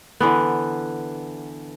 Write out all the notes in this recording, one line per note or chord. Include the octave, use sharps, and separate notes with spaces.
D3 E3 B3